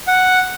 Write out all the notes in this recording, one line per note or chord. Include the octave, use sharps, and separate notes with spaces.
F#5